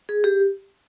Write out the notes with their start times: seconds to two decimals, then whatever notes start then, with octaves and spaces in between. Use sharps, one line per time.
0.09 G#4
0.24 G4